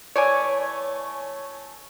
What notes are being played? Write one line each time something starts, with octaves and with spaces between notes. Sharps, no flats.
E3 A3 C#5 D5 G#5